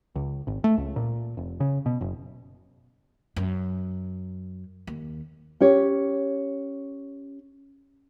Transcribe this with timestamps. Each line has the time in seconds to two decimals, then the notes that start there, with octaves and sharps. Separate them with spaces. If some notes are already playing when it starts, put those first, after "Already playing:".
0.16 C#2
0.47 G#1
0.64 A3
0.78 C#2
0.96 A#2
1.37 F1
1.60 C#3
1.86 B2
2.01 F#1
3.36 F#2
4.87 D#2
5.61 C#4 G4 C#5